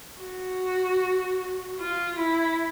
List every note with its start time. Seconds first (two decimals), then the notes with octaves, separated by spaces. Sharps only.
0.20 F#4
1.79 F4
2.18 E4